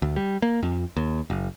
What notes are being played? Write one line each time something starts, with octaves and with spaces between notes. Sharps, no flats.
D2
G3
A#3
F2
D#2
F#1